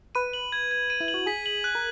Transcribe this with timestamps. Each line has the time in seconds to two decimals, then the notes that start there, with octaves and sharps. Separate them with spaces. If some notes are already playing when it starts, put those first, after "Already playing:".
0.15 B4 D#7
0.33 F#7
0.52 G#6
0.71 G#6
0.90 D#7
1.00 E4
1.08 F#7
1.14 F#4
1.26 G#4 B6
1.46 F#7
1.64 F#6
1.75 A#4